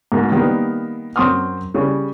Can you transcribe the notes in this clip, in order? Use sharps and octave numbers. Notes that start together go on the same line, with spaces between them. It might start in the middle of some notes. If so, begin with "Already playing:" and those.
G#2 B2 A#3
D#3 G3 A#3 B3
F#2 C4 C6 D#6 F6
C#3 G3